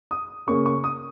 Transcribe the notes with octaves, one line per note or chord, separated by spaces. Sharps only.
D#6
C#3 A#3 C#4 C#6
C#6
D#6